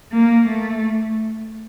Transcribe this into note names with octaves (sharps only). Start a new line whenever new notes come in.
A#3
A3